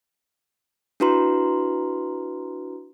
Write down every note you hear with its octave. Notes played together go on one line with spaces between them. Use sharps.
D4 E4 F#4 B4 A#5 C6